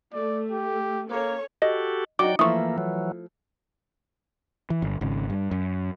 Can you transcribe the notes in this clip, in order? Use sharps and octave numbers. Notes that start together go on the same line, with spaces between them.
A3 D5
G4
A#3 C#4 A4 C#5
F#4 G4 A4 D#5
F#3 D#4 F#4 D5 G5 D6
E3 F3 A3 A#3 E4 C#6 D#6
E3 F#3
E3
G1
G#1 C#3
G2
F#2